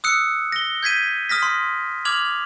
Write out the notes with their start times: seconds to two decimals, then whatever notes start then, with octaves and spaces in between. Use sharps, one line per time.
0.04 D#6 E6 F#6 C#7
0.52 A#6 G7
0.83 G6 G#6 B6 D#7
1.29 D#6 F6 A#6 B6
1.43 C6
2.05 D6 F6 G#6 F7 F#7